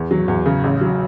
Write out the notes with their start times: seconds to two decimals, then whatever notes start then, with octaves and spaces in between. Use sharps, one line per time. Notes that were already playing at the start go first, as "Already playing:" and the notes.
Already playing: E2
0.11 F#3
0.28 E2
0.46 C#3
0.64 A1
0.81 F#3